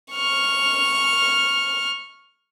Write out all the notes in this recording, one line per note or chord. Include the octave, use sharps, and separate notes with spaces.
C#6 F6